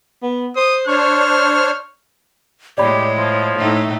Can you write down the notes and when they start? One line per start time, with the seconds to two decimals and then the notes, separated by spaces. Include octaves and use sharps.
0.23 B3
0.56 C5 D#6
0.88 D4 C5 C#5 C#6 F6
2.78 A2 G#3 G4 C#5 D5 B5
3.18 F3
3.58 A2 A3 D#4